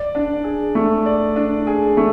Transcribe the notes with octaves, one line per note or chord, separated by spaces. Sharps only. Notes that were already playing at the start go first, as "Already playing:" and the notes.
Already playing: D5
D4
G#4
A3
D5
D4
G#4
A3